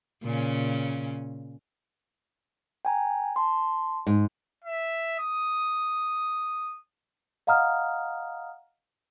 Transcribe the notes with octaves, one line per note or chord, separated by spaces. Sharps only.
A#2 C#3 C#4
G5 G#5 A#5
A5 C6
G#2
E5
D#6
D#5 F5 F#5 A#5 D#6 F6